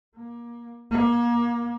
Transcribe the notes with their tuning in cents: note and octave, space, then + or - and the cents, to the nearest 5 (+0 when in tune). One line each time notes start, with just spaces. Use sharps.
A#3 +25
A#3 +30